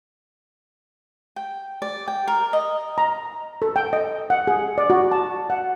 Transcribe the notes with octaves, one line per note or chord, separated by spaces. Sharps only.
G5
D5
G5
A#4
D#5
A#5
A4
G5
D#5
F#5
G#4
D5
F#4
A5
F#5